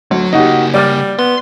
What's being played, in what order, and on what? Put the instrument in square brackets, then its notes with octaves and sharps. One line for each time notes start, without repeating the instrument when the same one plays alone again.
[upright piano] D2 [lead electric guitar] F#3
[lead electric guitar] C#3 A#3 [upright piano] D#4 F#4 G4
[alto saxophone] G3 [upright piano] D5 F6 A6
[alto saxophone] B3 [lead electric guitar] C6